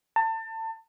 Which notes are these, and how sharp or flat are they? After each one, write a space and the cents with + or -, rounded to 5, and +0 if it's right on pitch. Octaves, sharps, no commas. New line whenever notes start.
A5 +30